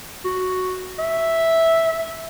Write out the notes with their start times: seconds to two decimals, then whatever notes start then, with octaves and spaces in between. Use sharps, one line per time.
0.25 F#4
0.99 E5